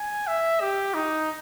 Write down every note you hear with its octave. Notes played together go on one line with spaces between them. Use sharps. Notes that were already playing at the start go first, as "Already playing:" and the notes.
Already playing: G#5
E5
G4
D#4